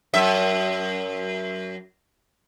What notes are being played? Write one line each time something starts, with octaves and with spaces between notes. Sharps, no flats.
F#2 E5